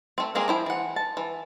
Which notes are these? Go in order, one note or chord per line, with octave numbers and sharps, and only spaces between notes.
A3 C4
G#3 A#3 C4 G#4 A#4
F3 E4 G5
E3 F#5
A5
E3